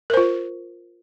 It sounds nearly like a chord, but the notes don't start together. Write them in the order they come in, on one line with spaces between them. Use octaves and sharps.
A#4 C5 F4